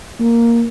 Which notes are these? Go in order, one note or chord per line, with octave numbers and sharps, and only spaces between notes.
A#3